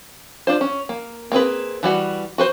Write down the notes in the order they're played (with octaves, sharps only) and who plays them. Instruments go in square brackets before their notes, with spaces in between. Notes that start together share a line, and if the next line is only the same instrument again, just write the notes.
[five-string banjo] D4 F4 C5
C#4
A#3
A#3 C4 G#4 B4
E3 G3 F#4
F#4 B4 C5